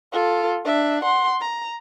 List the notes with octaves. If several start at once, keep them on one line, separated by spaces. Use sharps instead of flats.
F4 A4
D4 E5
F#5 C6
A#5